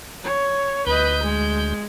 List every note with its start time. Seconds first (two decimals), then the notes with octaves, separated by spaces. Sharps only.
0.24 C#5
0.87 D2 B4 D#5 G6
1.23 G#3